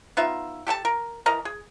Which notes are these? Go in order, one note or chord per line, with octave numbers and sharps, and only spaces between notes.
B3 D#4 F4 E5
G4 A4 G5 A5
A#4
E3 A#4 D#5 A#5
G#4